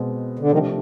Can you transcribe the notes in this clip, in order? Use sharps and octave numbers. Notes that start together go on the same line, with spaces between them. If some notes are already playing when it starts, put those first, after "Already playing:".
Already playing: B2 G#3 C4
D3
C3 D#3 F3 A3 D4 G4